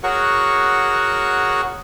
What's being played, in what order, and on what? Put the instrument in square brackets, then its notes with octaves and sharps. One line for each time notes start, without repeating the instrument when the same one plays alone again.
[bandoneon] F#4 G#4 A#4 C#5 F#5 C#6